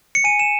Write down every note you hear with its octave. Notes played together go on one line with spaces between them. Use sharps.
C#7
G#5 D#7
E7